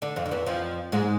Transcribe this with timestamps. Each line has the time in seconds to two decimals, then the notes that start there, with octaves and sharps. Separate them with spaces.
0.02 D3 D4
0.16 F2 F3
0.26 D3
0.31 E2 E3
0.46 F2 F3
0.92 G#2 G#3